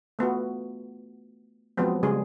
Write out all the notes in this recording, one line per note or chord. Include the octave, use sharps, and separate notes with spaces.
A3 B3 F4 F#4
F3 F#3 G#3 B3 C4
C#3 G3 G#3 G#4